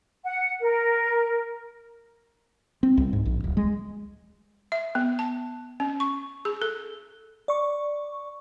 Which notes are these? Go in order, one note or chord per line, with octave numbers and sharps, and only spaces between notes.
F#5
A#4
C4
C2
G#2
A#1
D1
G#3
E5
B3
A5
C#4
C#6
G#4
A4
D5 C#6